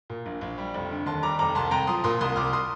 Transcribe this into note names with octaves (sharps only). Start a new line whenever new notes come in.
A#2
A#1
A#1
G3
F1
D3
D#2 A5 C6
G3 A#5 D6
F1 A#5 D6
C2 A5 C6
C2 G5 A#5
F3 C6 D#6
A#2 C6 D#6
C2 C6 D#6
C2 D6 F6
C6 D#6